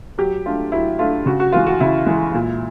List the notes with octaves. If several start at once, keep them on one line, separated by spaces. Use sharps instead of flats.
F#3 G4
A3 D4 F4
F#3 E4
A3 D4 F4
C#3 F#4
F#4
E3 G#3 F4
F#4
C#3 E4
E3 G#3
A#2